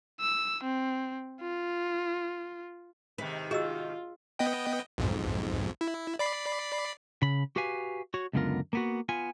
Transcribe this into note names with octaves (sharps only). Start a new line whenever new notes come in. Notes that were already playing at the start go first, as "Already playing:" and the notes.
E6
C4
F4
G#2 C3 D#3 B4
F4 F#4 G#4 D#5 E6
B3 D#5 G5
B1 F2 G#2
E4
D5 B5 C7
C#3 B5
F#4 G4 B4 F5 G#5
F#4 C#5
C#2 F#2 D3 B3 F4 A#4
A#3 B3 F#4
B3 F4 G#5